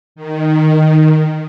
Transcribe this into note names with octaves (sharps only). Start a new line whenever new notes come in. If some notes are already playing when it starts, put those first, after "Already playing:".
D#3